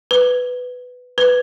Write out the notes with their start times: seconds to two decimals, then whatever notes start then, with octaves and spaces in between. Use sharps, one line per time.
0.11 B4
1.18 B4